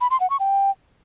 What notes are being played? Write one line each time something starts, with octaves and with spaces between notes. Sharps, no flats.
B5
C6
F#5
C#6
G5